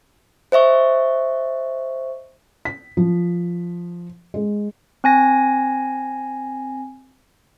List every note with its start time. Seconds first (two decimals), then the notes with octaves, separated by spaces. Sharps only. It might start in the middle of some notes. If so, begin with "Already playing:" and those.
0.52 C5 D#5 E5 C#6
2.65 B6
2.97 F3
4.34 G#3
5.04 C4 G#5 A#6